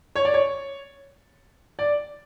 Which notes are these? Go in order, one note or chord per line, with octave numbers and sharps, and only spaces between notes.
C#5
D5
C#5
D5